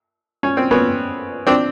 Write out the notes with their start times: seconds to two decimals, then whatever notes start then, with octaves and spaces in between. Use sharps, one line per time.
0.43 C#4
0.57 C4
0.71 B3 C#4
1.47 C4 D4